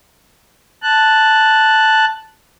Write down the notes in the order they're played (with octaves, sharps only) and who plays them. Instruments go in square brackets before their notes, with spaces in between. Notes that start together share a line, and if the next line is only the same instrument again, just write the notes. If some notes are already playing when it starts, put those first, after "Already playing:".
[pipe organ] A5 F#6